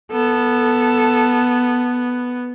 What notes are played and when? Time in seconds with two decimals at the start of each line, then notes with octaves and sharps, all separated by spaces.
0.12 B3 A4